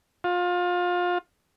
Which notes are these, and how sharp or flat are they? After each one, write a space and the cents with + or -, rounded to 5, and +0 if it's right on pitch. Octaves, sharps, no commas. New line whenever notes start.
F4 +25